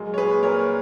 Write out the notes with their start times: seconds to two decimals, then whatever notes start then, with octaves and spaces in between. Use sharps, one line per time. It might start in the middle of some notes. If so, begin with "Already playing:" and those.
Already playing: A#2 F#3 G#3
0.14 C#5
0.18 A#2 G#4 B4
0.43 A#2 A#4 C#5